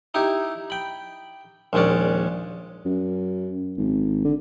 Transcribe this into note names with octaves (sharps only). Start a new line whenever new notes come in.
D#4 E4 G4
G5 B5
A#1 D#2 G#3 C#4 D5
F#2
G#1
D3